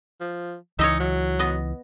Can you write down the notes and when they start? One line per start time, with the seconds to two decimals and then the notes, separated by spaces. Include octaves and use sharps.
0.21 F3
0.79 C#2 E3 D#4 C#5 D#5 E5
1.00 F#3
1.39 B3 D#5